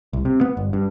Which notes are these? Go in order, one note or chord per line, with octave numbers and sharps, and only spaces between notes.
C2
C3
B3
G1
G2